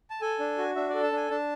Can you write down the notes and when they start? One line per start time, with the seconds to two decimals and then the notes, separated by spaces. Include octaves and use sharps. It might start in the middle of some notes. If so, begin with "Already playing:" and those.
0.10 A5
0.21 A4 G#5
0.39 D4
0.58 F#4
0.76 D4 E5
0.90 A4 D5
1.03 A5
1.12 D4 G#5
1.31 D4 A5